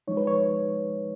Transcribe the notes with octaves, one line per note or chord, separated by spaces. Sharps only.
F3 G#3 D#4 C#5
B4
C#5